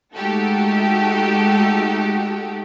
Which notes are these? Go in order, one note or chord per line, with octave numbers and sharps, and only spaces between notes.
G#3 A3 D#4 F#4 G4 A4